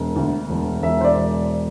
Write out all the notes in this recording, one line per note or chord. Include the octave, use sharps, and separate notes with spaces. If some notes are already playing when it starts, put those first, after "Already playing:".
Already playing: E1
D2
E1
E1 E5
C5
D5
E1